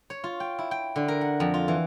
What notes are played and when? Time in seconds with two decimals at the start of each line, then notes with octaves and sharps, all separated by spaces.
0.10 C#5
0.24 F4
0.40 G5
0.59 E4
0.71 G5
0.96 D3
1.08 A#4
1.21 F#5
1.40 F2
1.54 F4
1.68 E3